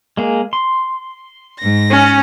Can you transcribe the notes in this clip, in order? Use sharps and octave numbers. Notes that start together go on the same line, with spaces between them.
G#3 A#3 G#4
C6
G#2 A#6
C#4